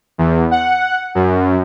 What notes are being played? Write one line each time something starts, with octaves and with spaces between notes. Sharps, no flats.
E2
F#5
F#2